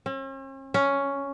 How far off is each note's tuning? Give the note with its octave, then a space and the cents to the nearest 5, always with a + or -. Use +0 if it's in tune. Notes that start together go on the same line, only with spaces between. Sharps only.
C#4 -45
C#4 +5